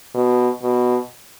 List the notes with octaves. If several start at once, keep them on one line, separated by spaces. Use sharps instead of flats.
B2
B2